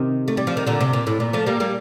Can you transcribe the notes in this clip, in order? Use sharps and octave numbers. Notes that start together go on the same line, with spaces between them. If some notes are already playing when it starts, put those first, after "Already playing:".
Already playing: C3 D#3
A3
G3
F3
D#3
A#2 D3
C3
A#2
A2
A#2
F3 A3
G3 A#3
G3 A#3